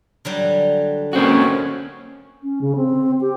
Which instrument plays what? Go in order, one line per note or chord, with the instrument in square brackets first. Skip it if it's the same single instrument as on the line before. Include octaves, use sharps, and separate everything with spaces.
[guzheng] D3 F#3 G3
[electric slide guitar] A#3 C4 F#4 [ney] C#4
[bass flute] C#4
C#3
C4
G4